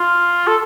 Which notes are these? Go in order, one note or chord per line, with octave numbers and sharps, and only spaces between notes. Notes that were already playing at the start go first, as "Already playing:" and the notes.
Already playing: F4
A4